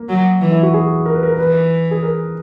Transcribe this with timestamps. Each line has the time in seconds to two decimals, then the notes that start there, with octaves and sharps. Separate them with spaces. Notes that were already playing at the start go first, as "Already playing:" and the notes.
Already playing: A#3
0.09 F#3
0.41 E3
0.52 E4
0.63 F#4
0.74 G#4
1.06 A#4
1.14 B4
1.23 A#4
1.39 E3 B4
1.91 G#4
2.03 A#4